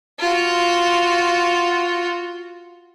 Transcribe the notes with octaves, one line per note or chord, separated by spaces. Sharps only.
F4 F#4